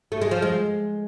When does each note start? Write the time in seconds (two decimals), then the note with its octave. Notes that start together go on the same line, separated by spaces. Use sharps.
0.12 A3
0.22 G#3
0.31 F3
0.42 G#3